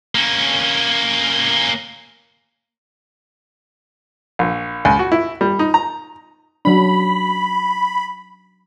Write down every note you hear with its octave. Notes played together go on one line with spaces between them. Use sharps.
A#3 C#4
A#1
C#2
F#4
E4
G3
D#4
A#5
F#3 D4 B5